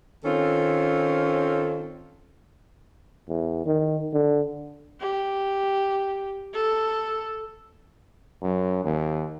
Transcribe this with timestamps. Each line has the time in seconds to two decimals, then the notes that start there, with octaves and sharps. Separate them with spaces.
0.25 D#3 C4 C#4 F4 A4
3.28 E2
3.66 D#3
4.13 D3
5.00 G4
6.54 A4
8.42 F#2
8.84 D#2